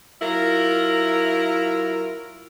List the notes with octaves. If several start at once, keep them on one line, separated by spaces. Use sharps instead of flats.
F#3 E4 F4 A#4